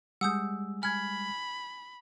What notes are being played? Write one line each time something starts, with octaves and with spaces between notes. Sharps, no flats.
G3 G#3 F#5 G#5 D#6 E6 G6
G#5 B5 F6 G#6